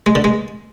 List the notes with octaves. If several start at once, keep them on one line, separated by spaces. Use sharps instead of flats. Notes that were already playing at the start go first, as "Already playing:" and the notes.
G#3
D3
G#3